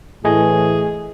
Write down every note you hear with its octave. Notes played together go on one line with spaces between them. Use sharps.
A2 E3 A3 G#4 D#5 G#5